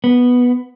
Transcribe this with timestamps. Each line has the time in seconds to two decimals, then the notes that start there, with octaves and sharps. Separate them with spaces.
0.04 B3